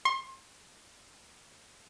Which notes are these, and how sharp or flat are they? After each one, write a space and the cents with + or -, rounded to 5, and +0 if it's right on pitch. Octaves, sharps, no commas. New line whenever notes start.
C6 +35